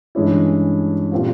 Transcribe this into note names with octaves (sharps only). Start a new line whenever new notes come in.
G2 E3 G#3 C#4 E4
A#2 G3 C4 F4